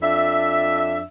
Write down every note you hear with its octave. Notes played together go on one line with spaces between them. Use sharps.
F2 D4 E5